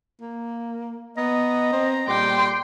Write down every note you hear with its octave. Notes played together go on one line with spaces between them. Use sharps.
A#3
B3 D#5 A#5
C4
A#2 G3 G5 C6 D6